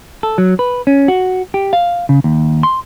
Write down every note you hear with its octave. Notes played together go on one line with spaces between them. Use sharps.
A4
F#3
B4
C#4
F#4
G4
F5
C#3
D#2
C6